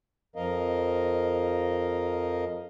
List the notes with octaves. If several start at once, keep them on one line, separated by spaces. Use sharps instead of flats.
F2 F3 A#4 D#5 F5